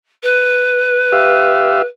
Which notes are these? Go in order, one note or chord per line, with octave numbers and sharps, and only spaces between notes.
B4
G4 E5 F5